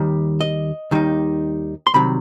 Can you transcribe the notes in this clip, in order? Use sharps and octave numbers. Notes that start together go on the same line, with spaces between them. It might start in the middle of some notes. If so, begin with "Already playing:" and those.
Already playing: D#2 D#3 G3
D#5
D#2 D#3 G3 D#4
C6
C2 C3 D#3 F#3 B5